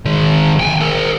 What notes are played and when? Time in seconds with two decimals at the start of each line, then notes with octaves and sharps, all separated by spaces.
0.05 D#3 G#3
0.60 G5 G#5
0.81 G#4 A#4